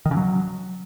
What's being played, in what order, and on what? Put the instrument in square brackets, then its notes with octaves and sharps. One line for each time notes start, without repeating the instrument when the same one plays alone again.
[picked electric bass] D#3
C#3
F#3